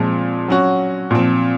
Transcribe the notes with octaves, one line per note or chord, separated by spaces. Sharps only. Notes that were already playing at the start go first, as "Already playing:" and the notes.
Already playing: A#2 F3 G#3 C4
F#3 C#4 F#4
A#2 F3 C4